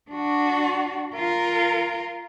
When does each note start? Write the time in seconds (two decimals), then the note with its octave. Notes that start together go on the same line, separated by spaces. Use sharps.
0.11 D4 F#4
1.16 F4 A#4